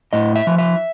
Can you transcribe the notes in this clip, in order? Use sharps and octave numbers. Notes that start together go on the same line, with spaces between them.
A2 D#5
E5
F3
E5